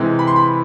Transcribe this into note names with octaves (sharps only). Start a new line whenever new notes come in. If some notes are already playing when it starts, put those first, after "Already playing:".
Already playing: C3 E3 G#3
B5
C6
B5